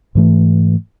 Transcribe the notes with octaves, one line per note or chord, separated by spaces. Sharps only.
G#2 E3 A3